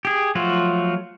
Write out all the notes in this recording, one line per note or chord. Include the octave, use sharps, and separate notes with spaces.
G4 G#4
F3 F#3 A3 F4 F#4